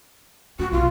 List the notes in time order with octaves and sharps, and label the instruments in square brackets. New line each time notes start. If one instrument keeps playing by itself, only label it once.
[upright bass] C4 [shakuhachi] F#4
[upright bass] B1 [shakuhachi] F4